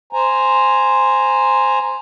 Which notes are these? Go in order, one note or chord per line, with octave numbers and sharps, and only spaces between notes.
C5 G#5 A#5